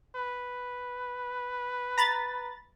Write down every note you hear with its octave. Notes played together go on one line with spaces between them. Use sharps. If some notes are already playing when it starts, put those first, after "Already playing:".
B4
A#5 B5 A6